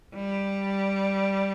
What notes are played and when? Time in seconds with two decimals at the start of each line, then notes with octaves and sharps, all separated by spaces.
0.15 G3